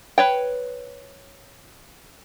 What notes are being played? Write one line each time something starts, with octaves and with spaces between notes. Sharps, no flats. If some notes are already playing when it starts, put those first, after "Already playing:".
B4 C#5 G5